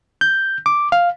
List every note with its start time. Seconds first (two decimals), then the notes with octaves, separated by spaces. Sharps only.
0.21 G6
0.66 D6
0.92 F5